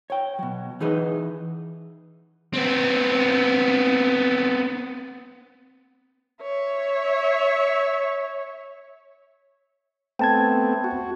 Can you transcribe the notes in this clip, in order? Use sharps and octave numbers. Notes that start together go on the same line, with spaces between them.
C#5 G5
B2 F#3
E3 D#4 G#4 B4 D#5
B3 C4
C#5 E5
A3 B3 C4 G5 A5 G#6
F#4